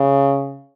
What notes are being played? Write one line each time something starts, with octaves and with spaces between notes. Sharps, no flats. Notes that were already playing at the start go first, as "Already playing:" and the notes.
Already playing: C#3